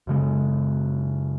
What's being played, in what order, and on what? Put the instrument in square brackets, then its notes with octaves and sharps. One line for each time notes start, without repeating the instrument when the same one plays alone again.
[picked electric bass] F#2 C#3 G#3